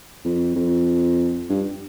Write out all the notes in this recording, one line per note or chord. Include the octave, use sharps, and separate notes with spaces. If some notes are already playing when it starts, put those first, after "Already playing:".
F2
F2
G2